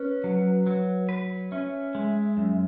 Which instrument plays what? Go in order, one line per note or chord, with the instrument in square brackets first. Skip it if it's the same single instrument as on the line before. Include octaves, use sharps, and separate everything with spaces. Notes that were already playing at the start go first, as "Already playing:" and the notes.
Already playing: [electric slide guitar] C#4 [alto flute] B4
[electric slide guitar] F#3
F#3
B4
[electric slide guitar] C#4 [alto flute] E5
[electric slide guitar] G#3
F#2